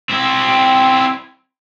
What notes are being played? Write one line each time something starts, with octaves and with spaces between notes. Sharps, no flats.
C4 E4